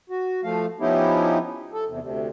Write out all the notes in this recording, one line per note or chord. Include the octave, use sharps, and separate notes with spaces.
F#4
F3 A3 F5
F3 B3 C#4 D#4 E4 G4
A4
E2 C3
D2 C3